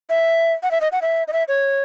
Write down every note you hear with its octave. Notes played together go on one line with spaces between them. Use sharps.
E5
F#5
E5
D#5
F#5
E5
D#5
E5
C#5